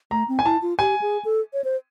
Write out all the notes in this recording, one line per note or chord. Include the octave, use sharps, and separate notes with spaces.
A3 A#5
C4
G#5
E4 A5
F4
G4 G#5
G#4
A4
C#5
C5